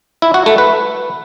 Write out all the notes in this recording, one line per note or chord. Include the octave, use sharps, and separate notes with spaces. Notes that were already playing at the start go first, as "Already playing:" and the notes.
E4
F#4
A3
B4